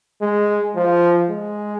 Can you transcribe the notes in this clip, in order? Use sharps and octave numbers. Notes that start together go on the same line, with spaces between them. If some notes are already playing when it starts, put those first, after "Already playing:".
G#3
F3
G#3